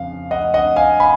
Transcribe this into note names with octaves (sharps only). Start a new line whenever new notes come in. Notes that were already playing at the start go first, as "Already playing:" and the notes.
Already playing: F2 C#3 F5
D#5 F#5
D#5 F#5
F5 G#5
G#5 B5